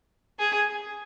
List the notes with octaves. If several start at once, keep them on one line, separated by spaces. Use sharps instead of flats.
G#4